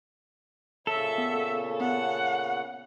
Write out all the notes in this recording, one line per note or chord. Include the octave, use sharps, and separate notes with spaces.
A#2 C#3 A4 C#5 E5
B3
B3 F#5